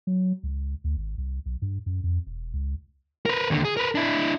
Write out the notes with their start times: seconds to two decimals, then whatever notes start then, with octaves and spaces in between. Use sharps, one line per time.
0.07 F#3
0.43 C#2
0.84 D2
0.96 G#1
1.18 C2
1.46 B1
1.62 G2
1.86 F#2
2.03 F2
2.27 E1
2.53 C#2
3.26 A#4 B4
3.50 D#2 D3
3.65 G#4
3.77 A#4 B4
3.95 D4 E4